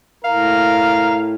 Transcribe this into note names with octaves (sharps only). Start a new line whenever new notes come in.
A2 A#4 F5